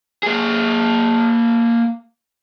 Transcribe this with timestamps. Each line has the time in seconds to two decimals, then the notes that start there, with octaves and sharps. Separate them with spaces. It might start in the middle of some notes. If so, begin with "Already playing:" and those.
0.23 A#3 G#4